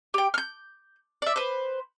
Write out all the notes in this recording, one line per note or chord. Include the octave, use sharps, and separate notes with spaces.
G4 G5
F6 G6
D5 E5
B4 C5